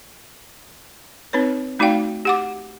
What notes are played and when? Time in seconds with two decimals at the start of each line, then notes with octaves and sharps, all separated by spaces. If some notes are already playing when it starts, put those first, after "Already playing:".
1.33 C4 D#4 B4 C#5
1.79 A3 D#4 F#4 D5 F5 G5
2.25 G4 F#5 D6